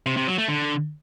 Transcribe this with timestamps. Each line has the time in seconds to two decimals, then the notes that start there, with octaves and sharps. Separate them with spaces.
0.06 C3
0.17 C3
0.27 F#3
0.38 A3
0.48 D3